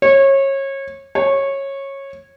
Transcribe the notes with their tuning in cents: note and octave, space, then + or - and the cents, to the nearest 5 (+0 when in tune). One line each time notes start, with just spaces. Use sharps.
C#5 -25
C#5 -15